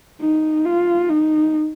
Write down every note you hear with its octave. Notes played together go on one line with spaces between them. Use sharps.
D#4
F4
D#4